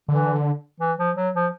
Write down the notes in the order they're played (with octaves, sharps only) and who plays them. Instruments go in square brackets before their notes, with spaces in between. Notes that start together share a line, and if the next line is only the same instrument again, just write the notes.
[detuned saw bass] D3 [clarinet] E3
[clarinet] E3
F3
F#3
F3